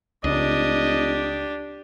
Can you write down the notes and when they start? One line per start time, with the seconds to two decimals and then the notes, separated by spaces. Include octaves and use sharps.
0.24 F1 C#2 D4 G4 D#5